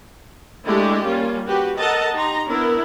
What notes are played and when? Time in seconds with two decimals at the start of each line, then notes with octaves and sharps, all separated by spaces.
0.65 G#3 A3 D4 E4 G4
1.05 G3 A#3 C#4 F4
1.46 F#4 G4 B4
1.78 A4 A#4 D#5 F#5 A5 A#5
2.14 D#4 G4 A#5 C6
2.48 B3 D4 E4 A#4